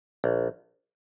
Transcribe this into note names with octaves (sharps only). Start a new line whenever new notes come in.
A#1